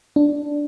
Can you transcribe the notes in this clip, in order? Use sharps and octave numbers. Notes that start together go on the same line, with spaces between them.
D4